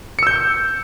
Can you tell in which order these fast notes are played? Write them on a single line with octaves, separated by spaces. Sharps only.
C#7 E6 G6